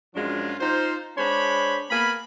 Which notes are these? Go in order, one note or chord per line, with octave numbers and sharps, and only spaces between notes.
F#2 F3 G#3 D4 F4
D#4 F4 C5
G#3 D4 C5 C#5 B5
A#3 B3 G#5 B5